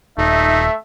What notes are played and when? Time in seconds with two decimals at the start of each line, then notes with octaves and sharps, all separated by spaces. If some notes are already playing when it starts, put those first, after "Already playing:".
0.18 D#1 A3 D#4 E5